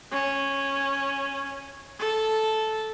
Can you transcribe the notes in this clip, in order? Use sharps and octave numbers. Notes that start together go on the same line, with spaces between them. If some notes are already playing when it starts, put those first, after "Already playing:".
C#4
A4